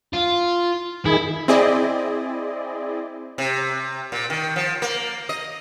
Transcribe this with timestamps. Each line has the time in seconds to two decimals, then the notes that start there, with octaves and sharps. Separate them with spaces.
0.13 F4
1.05 D#3 E4 G#4
1.48 C4 E4 G#4 D5 D#5
3.38 C3
4.12 A#2
4.30 D#3
4.56 F3
4.82 A#3
5.29 D#5